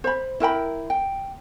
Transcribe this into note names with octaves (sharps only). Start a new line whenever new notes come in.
C5 B5
E4 A#4 G5 B5
G5